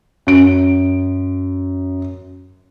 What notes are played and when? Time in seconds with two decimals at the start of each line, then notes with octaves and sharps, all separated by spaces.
0.27 F#2 D7